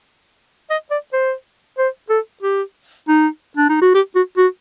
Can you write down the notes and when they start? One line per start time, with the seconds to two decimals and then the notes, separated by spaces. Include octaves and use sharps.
0.70 D#5
0.91 D5
1.13 C5
1.78 C5
2.10 A4
2.43 G4
3.08 D#4
3.57 D4
3.69 D#4
3.81 F#4
3.94 G4
4.15 F#4
4.37 F#4